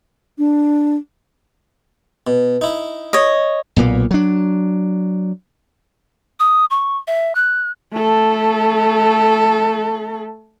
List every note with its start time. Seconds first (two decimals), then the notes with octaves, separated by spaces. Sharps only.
0.38 D4
2.27 B2
2.61 D#4 E4
3.13 C#5 D#5
3.76 B1 A#2 A#3 B3
4.11 F#3 D4
6.40 D#6
6.70 C#6
7.07 E5
7.35 F#6
7.93 A3 A4